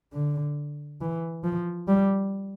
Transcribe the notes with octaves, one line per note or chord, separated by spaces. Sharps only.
D3
E3
F3
G3